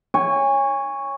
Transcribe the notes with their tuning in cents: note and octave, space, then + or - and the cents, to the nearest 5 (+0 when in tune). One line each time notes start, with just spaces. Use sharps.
C#5 +0 G#5 -30